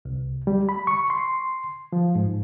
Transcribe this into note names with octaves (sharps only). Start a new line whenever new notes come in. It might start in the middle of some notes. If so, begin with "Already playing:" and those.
C2
G3
B5
C#6
C6
F3
G#2